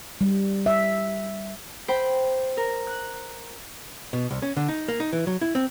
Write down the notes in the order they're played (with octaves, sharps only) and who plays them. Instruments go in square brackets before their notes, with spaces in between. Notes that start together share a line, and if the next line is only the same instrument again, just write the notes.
[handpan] G3
E5
[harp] C5 G5 B5
A#4
F#6
[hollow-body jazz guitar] B2
C2
C#4
D3
D#4
A#3
D#4
E3
F#3
E4
C4